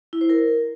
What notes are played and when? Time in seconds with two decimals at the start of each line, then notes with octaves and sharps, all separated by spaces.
0.13 E4
0.21 C5
0.29 A#4